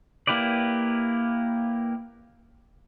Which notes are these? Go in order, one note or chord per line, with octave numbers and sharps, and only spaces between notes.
A#3 E4 G4 B4 D5